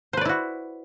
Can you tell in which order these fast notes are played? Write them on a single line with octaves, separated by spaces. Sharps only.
C5 B4 D5 E4 F#4